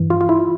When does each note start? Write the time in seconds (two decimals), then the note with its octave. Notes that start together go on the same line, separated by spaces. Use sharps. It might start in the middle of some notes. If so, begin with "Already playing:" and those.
Already playing: G2 E3
0.10 F4
0.21 F4
0.29 E4